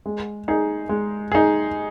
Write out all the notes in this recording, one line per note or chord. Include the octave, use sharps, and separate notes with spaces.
G#3
D#4 G#4
G#3
D#4 G#4